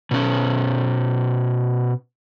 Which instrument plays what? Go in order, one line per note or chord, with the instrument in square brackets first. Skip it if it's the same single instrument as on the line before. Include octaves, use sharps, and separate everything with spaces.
[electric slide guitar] B2 C#4